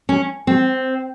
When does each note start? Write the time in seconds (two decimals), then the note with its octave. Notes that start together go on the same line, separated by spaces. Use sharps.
0.09 C#4
0.47 C4